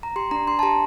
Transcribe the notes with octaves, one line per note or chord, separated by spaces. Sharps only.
A#5
G4 C6
D4 A#5
D4 C6
A5
G4 A#5